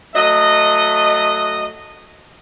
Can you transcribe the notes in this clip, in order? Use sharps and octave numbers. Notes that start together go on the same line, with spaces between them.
F#3 A3 D#5